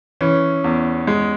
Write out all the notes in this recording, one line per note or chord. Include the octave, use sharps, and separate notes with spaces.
E3 C#4
E2
G#3